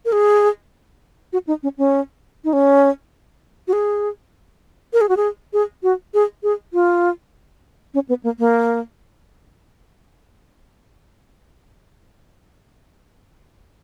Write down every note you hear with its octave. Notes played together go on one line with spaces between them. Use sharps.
A#4
G#4
F#4
D#4
C#4
C#4
D#4
C#4
F#4
G#4
A#4
G#4
F#4
G#4
G#4
F#4
G#4
G#4
F4
C#4
B3
A#3
A#3